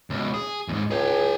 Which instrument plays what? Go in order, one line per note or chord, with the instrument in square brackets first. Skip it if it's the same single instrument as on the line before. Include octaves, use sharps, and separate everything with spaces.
[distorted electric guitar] C#2 B2
G#4
E2 G#2
[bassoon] C#2 [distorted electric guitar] G#4 G5